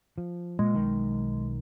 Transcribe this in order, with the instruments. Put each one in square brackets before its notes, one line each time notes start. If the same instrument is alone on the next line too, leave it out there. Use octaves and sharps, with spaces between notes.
[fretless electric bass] F3
[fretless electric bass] A#2 [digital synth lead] G#3
[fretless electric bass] B1 D#3